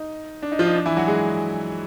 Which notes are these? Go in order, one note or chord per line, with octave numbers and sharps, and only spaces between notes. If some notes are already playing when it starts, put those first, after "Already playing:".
Already playing: D#4
D4
D#4
F3 F4
D#4
D4
E3 E4
F#3 F#4
G#3 G#4